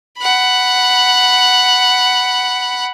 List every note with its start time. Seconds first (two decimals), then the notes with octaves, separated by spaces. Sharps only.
0.18 F#5 B5